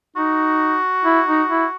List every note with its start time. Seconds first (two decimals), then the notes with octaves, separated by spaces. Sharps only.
0.16 D#4 F#4
1.05 E4
1.27 D#4
1.50 E4